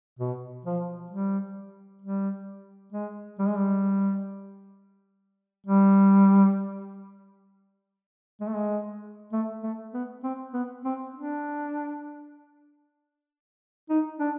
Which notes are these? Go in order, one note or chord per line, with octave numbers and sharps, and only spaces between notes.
B2
F3
G3
G3
G#3
G3
G#3
G3
G3
G#3
A3
G#3
A3
A3
B3
C4
B3
C4
D4
D#4
D4